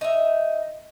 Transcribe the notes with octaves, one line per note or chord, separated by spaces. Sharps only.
D#4 E5